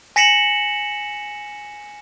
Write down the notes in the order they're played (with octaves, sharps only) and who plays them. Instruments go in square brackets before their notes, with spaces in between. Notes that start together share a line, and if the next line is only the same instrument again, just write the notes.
[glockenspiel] G#5 A#6 B6 C#7 E7 F#7